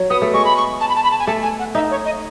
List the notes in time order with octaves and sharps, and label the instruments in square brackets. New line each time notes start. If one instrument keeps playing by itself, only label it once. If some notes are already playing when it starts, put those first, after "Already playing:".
Already playing: [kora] F#3
[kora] B3 [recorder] D#6
[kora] A3
[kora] G#3 [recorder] C#6
[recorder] B5
C#6
A5
B5
A5
B5
A5
G#5
[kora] A3 [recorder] A5
[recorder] G#5
F#5
[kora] D#4 [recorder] E5
[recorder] C#5
D#5